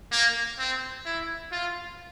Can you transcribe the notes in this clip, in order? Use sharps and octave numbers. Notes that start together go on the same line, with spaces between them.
A#3
C4
E4
F4